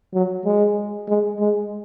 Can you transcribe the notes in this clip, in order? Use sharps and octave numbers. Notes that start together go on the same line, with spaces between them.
F#3
G#3
G#3
G#3